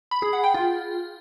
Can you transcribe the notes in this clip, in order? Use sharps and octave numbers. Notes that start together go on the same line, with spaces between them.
B5
G#4
F#5
G5
F4